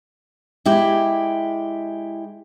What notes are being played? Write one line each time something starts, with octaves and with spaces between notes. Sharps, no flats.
G#3 E4 G4